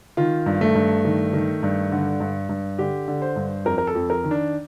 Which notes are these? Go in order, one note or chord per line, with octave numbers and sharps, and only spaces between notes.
D#3 F4
G2
A3
G2
D#3
D#3
G2
D3
G2
G2
D3 G4
D3
C5
G2
F2 A#4
A#4
A4
F2
A#4
D#3
D4